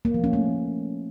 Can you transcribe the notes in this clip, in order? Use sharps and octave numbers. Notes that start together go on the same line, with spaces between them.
A#3
F3
C#4
A3